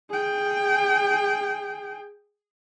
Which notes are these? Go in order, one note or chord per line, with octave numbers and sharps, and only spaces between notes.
G#4 G5